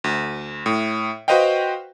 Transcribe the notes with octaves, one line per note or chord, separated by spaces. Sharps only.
D2
A2
F#4 B4 C5 D#5 F5 G5